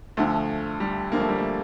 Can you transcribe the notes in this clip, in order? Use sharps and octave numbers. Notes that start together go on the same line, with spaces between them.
D2 D3 F3 A3
G3
D2 D3 F3 A#3
A3
G3
A3